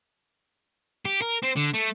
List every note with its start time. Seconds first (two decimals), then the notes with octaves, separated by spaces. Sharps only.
1.05 G4
1.22 A#4
1.43 C4
1.56 D3
1.74 A3